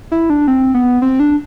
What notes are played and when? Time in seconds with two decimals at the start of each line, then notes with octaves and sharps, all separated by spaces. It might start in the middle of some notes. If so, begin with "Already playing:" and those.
0.12 E4
0.30 D4
0.48 C4
0.74 B3
1.02 C4
1.20 D4